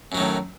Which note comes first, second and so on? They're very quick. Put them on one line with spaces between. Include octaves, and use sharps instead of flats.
F#2 F#3 D#3 A2